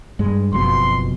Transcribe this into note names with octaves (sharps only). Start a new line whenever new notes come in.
G2 G#3
F#1 F2 B2 C6